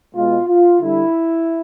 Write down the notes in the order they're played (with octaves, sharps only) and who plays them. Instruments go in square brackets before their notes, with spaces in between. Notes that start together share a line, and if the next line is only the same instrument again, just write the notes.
[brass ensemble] B2 G#3 F4
F4
D3 G3 E4